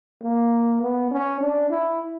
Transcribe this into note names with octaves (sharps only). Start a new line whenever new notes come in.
A#3
B3
C#4
D4
E4